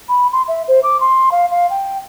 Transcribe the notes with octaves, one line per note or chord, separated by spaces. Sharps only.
B5
C6
E5
C5
D6
C6
F5
F5
G5